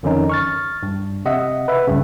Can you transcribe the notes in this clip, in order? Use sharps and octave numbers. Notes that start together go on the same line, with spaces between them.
F2 D3 D#3 C#4 D#4
C#6 F6 A6
G2
C3 D#5 E5 F#5
B4 E5
C#2 G2 C#3